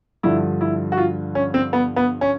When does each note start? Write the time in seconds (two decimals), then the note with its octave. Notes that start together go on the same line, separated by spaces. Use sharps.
0.23 G2 D3 F3 E4
0.61 E4
0.92 F#4
0.98 F4
1.35 C#4
1.54 C4
1.73 B3
1.96 B3
2.21 C#4